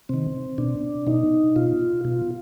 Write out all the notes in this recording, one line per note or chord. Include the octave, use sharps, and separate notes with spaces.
C3 D#3 C4
B2 D4
B2 D#4
B2 F4
B2 F4